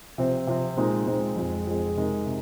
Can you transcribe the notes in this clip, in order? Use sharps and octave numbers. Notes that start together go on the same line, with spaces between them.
C3 F3 C4
C3 F3 C4
A#2 G#3 C4 D#4
A#2 G#3 C4 D#4
F2 F3 G#3 C4 G#4
F2 F3 G#3 C4 G#4
C3 G#3 D#4 A#4
C3